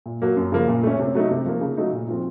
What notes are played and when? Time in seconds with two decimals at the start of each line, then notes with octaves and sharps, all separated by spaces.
0.06 A#2
0.22 F#3 A#3
0.37 F#2
0.52 C#3 F3 A#3
0.68 A#2
0.83 A3 C#4
0.99 C3
1.15 F#3 A3 D#4
1.31 C3
1.46 F3 A#3
1.61 C#3
1.77 F#3 A3 D#4
1.93 A#2
2.08 F3 C4 F4